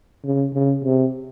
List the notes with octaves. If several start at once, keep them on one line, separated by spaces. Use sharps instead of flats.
C#3
C#3
C3